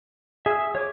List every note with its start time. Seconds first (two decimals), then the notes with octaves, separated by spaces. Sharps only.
0.46 G#4 E5 E6
0.75 C#5 D6